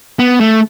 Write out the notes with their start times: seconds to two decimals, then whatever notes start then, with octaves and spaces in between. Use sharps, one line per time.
0.19 B3
0.40 A3